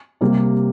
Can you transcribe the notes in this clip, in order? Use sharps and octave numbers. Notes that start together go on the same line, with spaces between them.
C3 G3 A#3